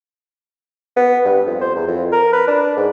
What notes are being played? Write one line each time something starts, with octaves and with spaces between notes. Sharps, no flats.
B3
G2
F2
C5
E2
F2
A#4
B4
D4
G#2